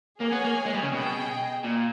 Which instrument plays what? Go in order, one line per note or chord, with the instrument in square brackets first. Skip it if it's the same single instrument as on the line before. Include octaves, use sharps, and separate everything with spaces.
[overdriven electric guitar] A#3 [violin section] G#4 C#5 G#5
[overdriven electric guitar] B3
A#3
G#3
G3
C#3
[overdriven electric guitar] B2 [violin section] G#4 D#5 G5
[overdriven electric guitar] A#2